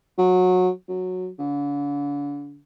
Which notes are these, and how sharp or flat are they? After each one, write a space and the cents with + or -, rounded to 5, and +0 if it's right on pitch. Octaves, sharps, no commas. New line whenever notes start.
F#3 -20
F#3 -10
D3 -40